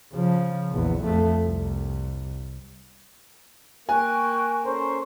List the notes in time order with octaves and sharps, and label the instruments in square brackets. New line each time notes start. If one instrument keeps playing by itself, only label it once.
[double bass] C#3 F3
A#1 E2
F2 A3
C2
[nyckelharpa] A#3 [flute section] G5 C#6 F#6 [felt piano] G#5
[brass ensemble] C#4 A#4 C5 [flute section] A4 C#6